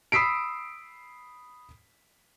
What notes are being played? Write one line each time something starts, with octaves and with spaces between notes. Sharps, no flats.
B5 D#6 E6 B6 C7 D7